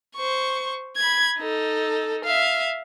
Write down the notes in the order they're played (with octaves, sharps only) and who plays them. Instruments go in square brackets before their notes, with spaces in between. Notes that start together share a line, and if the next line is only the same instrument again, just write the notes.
[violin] C5 C#6
B5 G#6
D#4 A4
E5 F5